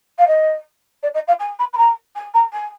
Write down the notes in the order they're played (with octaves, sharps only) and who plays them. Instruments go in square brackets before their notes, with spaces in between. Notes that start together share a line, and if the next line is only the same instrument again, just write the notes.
[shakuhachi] F5
D#5
D5
D#5
F5
G#5
B5
B5
A#5
G#5
A#5
G#5